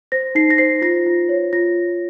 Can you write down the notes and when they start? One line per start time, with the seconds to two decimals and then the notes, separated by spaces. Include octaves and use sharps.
0.12 C5 A#6
0.35 D#4 C7
0.50 A#6
0.58 C5 C7
0.82 F4 A#6
1.06 F4
1.29 C#5
1.53 F4 A#6